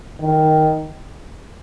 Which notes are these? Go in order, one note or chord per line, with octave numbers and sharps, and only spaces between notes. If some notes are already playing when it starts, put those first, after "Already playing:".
D#3